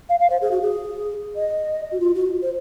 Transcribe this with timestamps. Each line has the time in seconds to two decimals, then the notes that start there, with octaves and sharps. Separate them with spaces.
0.09 F5
0.19 F5
0.30 C5
0.41 G#4
0.51 F#4
0.61 G#4
1.35 D#5
1.92 F#4
2.00 F4
2.15 F#4
2.42 C5